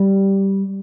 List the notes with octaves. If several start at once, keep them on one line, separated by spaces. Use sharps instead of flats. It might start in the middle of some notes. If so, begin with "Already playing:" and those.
Already playing: G3